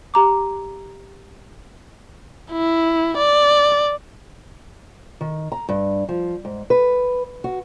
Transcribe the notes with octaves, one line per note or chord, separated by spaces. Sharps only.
G4 A#5 D6
E4
D5
D#3
A#5
G2
F3
G#2
B4
F#4